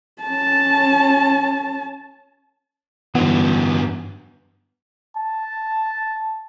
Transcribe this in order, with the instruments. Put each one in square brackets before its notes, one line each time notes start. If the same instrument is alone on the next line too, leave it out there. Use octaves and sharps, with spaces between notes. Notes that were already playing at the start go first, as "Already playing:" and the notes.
[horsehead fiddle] C#4 A5
[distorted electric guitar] G2 F#3 [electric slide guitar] D3 E3 [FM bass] B3
[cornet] A5